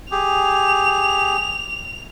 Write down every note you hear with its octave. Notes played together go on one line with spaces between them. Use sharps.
G4 G#4 F7